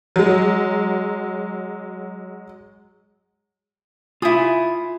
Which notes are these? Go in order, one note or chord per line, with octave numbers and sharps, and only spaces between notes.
F#3 G#3
E4 F4 G#5 D#6